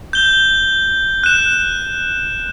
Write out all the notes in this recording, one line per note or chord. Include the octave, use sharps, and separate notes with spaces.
G6 G7
F#6 E7